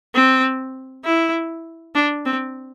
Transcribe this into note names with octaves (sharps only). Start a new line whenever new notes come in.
C4
E4
D4
C4